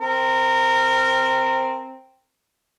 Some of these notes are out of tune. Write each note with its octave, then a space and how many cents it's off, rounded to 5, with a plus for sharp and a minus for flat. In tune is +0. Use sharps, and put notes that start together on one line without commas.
C4 +0 A#4 -20